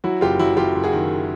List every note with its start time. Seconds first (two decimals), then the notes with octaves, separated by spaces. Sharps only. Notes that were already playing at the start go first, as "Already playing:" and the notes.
0.04 F#3 E4 F#4
0.21 F#1 F4 G4
0.39 F#3 E4 F#4
0.57 F#3 F4 G4
0.75 F#1
0.83 F#4 G#4
0.93 D#3